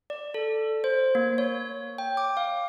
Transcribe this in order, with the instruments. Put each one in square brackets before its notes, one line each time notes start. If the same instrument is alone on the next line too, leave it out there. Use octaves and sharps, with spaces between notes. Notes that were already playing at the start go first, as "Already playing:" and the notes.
[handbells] D5
A4
C5
A#3
C#5
G5
D6
F5